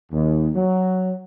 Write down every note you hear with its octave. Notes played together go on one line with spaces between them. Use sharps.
D#2
F#3